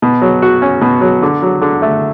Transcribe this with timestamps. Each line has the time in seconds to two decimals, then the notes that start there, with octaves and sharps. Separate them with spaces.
0.02 B2
0.22 F#3
0.42 F#4
0.62 C#4
0.81 B2
1.01 F#3
1.22 D3
1.42 F#3
1.61 D3
1.82 A3